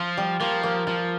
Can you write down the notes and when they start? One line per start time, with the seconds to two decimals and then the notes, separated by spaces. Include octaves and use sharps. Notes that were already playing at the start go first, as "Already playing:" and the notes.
Already playing: F3 F4
0.17 G3
0.40 F3 A#3
0.63 A#3
0.87 F3 F4